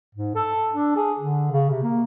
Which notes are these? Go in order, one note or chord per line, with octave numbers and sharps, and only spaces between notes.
G#2
A4
D4
G#4
D3
C#3
C3
A#3